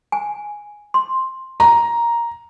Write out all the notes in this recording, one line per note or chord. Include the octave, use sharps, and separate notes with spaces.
G#5
C6
A#5